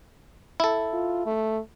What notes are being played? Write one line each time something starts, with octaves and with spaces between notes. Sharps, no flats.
E4 A4
F4
A3